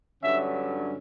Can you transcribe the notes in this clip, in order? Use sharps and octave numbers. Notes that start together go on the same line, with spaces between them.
G2 D3 F#3 C#4 E5